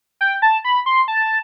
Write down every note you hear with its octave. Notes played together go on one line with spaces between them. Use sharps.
G5
A5
B5
C6
A5